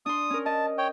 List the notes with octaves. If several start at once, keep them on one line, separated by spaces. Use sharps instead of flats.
D4 C6 D#6
C#4 A#4
D#5 A5
C#5 G5